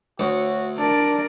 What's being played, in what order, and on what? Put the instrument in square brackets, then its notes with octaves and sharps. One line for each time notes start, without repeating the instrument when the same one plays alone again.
[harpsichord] D2 [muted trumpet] F#4 [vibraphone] C#5
[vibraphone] D4 [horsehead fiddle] A#4 D5 [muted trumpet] A5